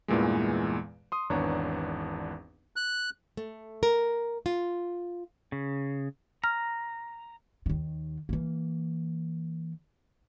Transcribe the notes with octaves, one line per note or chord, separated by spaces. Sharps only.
E2 G2 A#2 E3 G#3
C6 D#6
G#1 E2 B3 D4 C#5 A#5
F#6
A3
A#4
F4
C#3
A#5 F6
D#2 D#3
E3 A#3